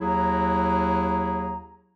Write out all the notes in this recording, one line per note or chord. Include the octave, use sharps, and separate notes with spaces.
D#2 F#3 E4 G#4 A#5